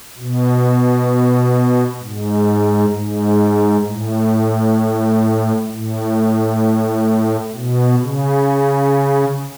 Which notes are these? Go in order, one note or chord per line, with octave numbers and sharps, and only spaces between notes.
B2
G#2
G#2
A2
A2
B2
C#3